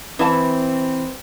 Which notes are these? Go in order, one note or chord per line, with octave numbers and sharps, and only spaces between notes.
E3 C4 A5